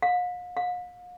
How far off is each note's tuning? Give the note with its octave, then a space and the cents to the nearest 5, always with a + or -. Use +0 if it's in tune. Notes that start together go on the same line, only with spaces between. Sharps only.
F5 +45
F5 +45